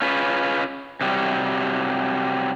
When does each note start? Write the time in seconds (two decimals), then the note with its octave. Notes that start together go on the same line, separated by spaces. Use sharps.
0.02 C#4 F4 G#4 B4
1.01 C3 F#3 G3